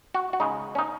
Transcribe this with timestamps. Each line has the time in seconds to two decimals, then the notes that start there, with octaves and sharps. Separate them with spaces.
0.14 F#4
0.33 F#4
0.40 C#3 G#3 D#4
0.75 C#4
0.78 D#4